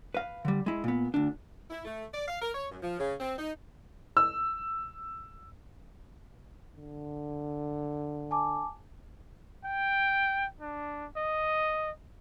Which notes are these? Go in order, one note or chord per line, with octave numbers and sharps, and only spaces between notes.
B4 F5
D3 G3
G#3 E4
A#2 B3
D2 D4
E4
A3
D5
F5
A#4
C#5
F#2
F3
C#3
C4
D#4
E6
D3
G#5 A5 D6
G5
D4
D#5